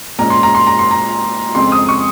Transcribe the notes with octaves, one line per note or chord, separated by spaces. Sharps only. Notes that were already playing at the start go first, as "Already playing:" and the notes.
A#2 G#3 C#4 A#5
C6
A#5
C6
A#5
C6
A#5
F2 C#3 G#3 C4 C6
D#6
C#6